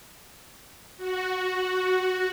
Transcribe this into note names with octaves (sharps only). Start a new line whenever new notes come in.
F#4